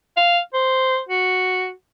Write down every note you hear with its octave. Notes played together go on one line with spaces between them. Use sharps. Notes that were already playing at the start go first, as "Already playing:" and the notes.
F5
C5
F#4